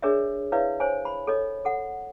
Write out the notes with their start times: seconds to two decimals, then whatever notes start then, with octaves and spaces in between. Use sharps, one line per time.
0.02 D4 G#4 A#4 C#5 D5 E5
0.52 E4 B4 C#5 D5 E5 F5
0.80 C5 C#5 G#5
1.05 B5
1.27 A4 C#5 D#5
1.65 A4 F#5